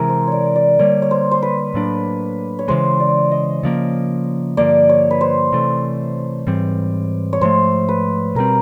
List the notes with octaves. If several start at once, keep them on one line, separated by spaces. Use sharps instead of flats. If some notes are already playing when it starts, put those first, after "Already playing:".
Already playing: C3 E3 G#3 A#4
C5
C#5 D5
D5
D3 G3 A#3 C#5
C#5
C5
C5
B4
A2 F#3 A#3 D4
C#5
C#3 E3 G#3 C5
D5
D#5
C#3 F3 A#3
G2 D3 F3 A#3 D5
C#5
B4
C5
C3 E3 A3
G#2 E3 G3 C4
C#5
G#2 F3 A3 C5
B4
B2 G3 C4 A#4